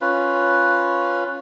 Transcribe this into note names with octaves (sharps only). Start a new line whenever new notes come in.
C#4 F4 B4